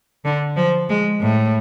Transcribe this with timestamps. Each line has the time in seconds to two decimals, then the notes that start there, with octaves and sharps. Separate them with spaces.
0.25 D3
0.57 F3
0.89 G#3
1.21 A2